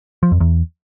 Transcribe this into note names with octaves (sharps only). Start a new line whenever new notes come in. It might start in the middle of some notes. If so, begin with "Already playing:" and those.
F3
F2
E2